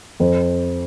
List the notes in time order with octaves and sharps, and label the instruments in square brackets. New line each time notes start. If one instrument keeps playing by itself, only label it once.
[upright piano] F2 C5